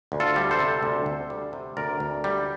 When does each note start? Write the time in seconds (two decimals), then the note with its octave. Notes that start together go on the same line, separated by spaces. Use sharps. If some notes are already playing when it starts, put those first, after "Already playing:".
0.12 D2
0.20 F4 A4
0.36 G3
0.51 A4 C5
0.59 C3
0.83 D2
1.06 D2
1.30 G3
1.53 C3
1.77 D2 A#4 D5
2.00 D2
2.24 G3